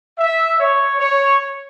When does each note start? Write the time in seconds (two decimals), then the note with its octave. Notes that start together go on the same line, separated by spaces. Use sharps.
0.17 E5
0.58 C#5
0.98 C#5